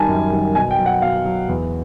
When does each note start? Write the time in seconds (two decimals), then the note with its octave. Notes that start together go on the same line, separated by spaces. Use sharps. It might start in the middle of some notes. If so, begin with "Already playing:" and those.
Already playing: D#3 G3 G#5 A5
0.08 F#2
0.31 D#3 G3
0.55 B2 G#5
0.71 G5
0.78 F#3
0.86 F#5
1.02 B2 F5
1.25 F#3
1.49 E2